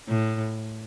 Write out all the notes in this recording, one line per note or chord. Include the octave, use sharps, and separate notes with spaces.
A2